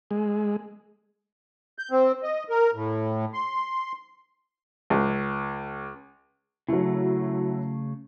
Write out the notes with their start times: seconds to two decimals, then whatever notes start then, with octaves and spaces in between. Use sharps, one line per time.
0.11 G#3
1.79 G6
1.91 C4
2.23 D#5
2.49 A#4
2.74 A2
3.33 C6
4.90 C#2
6.68 C#3 F#3 A3 E4